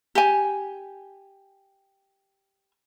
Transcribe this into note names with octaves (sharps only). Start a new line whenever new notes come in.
G4 G#5